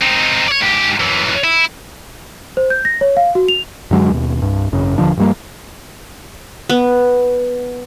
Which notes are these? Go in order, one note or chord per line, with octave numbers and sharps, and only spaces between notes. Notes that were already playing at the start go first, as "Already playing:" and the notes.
C4 D#4
C#5 D5
G#2 G4
F#2 E3
E4
C5
G6
A#6
C#5
F5
F#4
F7
F#2 D3 F#3 G#3
D#2 B2
C2 G2
G#1 F#2 C#3
D#1 D3 F3 D4
G2 F3 G3 A#3
B3